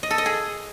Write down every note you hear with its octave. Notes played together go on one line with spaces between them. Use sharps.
D#5
A4
D#5
G#4